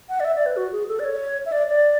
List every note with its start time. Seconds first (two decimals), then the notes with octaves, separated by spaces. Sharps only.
0.09 F#5
0.20 D5
0.25 E5
0.36 D5
0.46 B4
0.57 F#4
0.73 G#4
0.88 A4
0.99 D5
1.04 C#5
1.46 E5
1.52 D5
1.68 D5